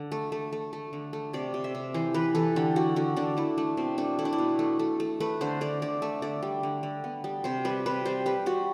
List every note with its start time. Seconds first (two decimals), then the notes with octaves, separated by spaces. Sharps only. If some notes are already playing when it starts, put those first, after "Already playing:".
Already playing: D3
0.12 A3
0.32 A3
0.52 A3
0.73 A3
0.93 D3
1.13 A3
1.33 C3 D5
1.54 C3
1.64 E5
1.75 C3
1.94 E3 C5
2.14 E3 B4
2.35 E3 A4
2.56 D3 G4
2.76 D3 F#4
2.96 D3 F#4
3.16 D3 D4
3.37 A3 E4
3.58 A3 D4
3.77 B2 C4
3.98 A3 D4
4.19 A3 E4
4.25 D4
4.33 E4
4.38 B2
4.59 A3
4.79 A3
5.00 A3
5.20 A3 B4
5.41 D3 C5
5.61 D3 D5
5.82 D3 D5
6.02 A3 E5
6.22 D3 D5
6.42 G3
6.63 D3
6.83 D3
7.04 B3
7.24 G3
7.44 C3 C5
7.65 G3 B4
7.86 C3 B4
8.05 G3 C5
8.26 G3 B4
8.46 G3 F#4